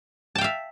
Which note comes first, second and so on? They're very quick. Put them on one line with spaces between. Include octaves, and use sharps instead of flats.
A5 G5 F5 E5